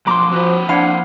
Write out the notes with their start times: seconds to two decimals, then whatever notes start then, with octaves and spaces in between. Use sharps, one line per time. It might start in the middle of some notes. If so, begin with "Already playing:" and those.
0.07 B1 F3 A#5 C6 D6
0.32 F3 C4 F#4 B4
0.69 F3 D4 E4 F5 F#5